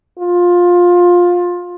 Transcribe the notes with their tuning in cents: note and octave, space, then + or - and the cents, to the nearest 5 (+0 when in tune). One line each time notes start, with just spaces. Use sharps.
F4 +15